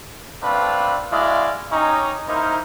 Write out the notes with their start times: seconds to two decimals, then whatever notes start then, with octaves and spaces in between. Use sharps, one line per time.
0.42 A3 C4 D4 B4 F5 B5
1.12 G#3 E4 F#4 D5 D#5 F5
1.71 C#4 D#4 G4 C#5 D#5 A#5
2.28 A#3 D#4 E4 A#4 C5